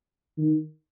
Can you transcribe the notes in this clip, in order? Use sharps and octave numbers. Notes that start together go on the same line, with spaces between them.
D#3